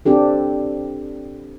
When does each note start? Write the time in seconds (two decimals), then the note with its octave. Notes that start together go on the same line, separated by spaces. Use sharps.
0.06 C4 D4 G4 A4